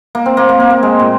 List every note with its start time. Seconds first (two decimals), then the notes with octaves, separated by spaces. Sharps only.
0.15 A#3
0.26 C4
0.37 A#3
0.49 A#3
0.60 A#3
0.70 A#3
0.83 G#3
0.99 A#2